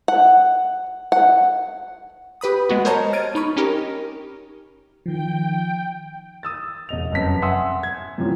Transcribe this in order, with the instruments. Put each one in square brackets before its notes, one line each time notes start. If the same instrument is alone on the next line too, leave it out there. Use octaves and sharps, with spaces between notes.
[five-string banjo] F#5
F#5
[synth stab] G4 B4 B5 D#6
G#3 B3 F#4
A#4 C5 C#5 D#5 A5 A#5
F6 G#6 A6 D7 D#7
D#4 B5 C#6
C#4 D#4 G4 A#4
[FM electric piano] D#3 F3 [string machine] G5
[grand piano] D#6 E6 A6
E1 D#5 F7
F1 F#2 B3 A5 B6
E5 F#5 G#5 C6 D#6 E6
G#6
F#2 C3 E3 F3 G3